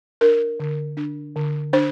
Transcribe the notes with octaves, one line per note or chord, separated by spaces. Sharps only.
D4 A#4
D3
D4
D3
D4 C5